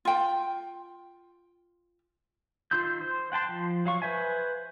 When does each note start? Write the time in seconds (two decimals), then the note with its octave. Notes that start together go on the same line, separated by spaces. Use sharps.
0.05 F4 G5
2.71 D#3 F4 C6 E6 G6
3.01 C5
3.32 F#5 G5 A5 C6
3.49 F3
3.85 F#3 F5 C#6
4.02 B4 C5 E5 G#5